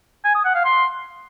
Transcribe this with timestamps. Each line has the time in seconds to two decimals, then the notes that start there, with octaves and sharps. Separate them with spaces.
0.24 G#5
0.35 D#6
0.45 F#5
0.55 F5
0.65 C6